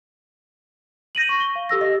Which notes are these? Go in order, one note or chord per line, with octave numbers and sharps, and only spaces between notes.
G6 A#6 D#7 F#7
C#6
G7
F5
G4 A4 E6 A#6
D#5